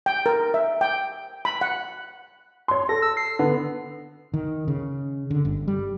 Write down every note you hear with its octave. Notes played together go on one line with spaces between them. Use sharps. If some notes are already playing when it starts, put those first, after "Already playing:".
G5
A#4
E5
G5
B5
F#5
C#5 C6
A4 A#6
E6
C7
D3 B3
D#3
C#3
D3
G1
G3